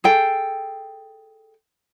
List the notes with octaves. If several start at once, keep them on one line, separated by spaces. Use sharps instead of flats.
G#4 A4 G5